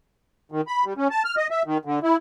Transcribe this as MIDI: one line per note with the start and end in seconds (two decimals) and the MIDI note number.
0.52 0.61 51
0.67 0.85 83
0.85 0.93 55
0.97 1.08 61
1.10 1.23 81
1.25 1.35 89
1.37 1.47 75
1.51 1.63 76
1.66 1.78 51
1.85 1.99 50
2.03 2.17 64